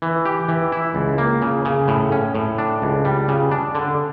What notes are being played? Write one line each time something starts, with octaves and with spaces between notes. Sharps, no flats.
E3
G4
E3
E4
C#2
A#3
C#3
C#3
A2
C#4
A2
D4
C#2
G3
C#3
D4
D3